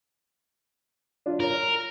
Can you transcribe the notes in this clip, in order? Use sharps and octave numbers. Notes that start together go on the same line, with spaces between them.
D4 F4
A#4 C#5